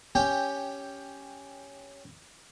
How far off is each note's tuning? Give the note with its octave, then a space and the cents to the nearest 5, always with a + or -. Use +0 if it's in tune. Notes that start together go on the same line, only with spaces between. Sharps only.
C#4 +5 G4 +0 G5 +10